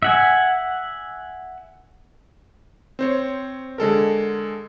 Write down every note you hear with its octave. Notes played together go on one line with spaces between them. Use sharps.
E5 F#5 G#5
C4 C5 C#5
D3 G#3 A4 A#4